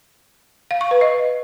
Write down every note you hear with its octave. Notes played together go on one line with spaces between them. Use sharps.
F5
C#6
B4
D#5